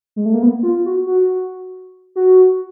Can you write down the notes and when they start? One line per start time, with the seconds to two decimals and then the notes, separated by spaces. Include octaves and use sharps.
0.16 G#3
0.25 A3
0.34 A#3
0.42 B3
0.63 F4
0.86 F#4
1.07 F#4
2.16 F#4